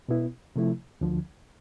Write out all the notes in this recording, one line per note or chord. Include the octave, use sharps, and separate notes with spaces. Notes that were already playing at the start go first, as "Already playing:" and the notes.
B2 B3 E4
C3 F3 A3 E4
D2 D3 F3